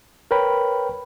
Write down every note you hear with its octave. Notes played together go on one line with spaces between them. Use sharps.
A#4 B4 C#5 G5 B5